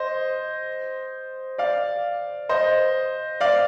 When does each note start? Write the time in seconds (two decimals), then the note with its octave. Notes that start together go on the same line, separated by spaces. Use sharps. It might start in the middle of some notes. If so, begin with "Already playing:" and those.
Already playing: C5 D#5
1.58 D5 F5
2.49 C5 D#5
3.41 D5 F5